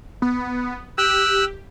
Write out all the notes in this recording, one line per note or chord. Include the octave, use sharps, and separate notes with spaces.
B3
G4 E6 F#6